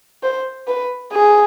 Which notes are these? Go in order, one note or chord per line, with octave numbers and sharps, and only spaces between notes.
C5
B4
G#4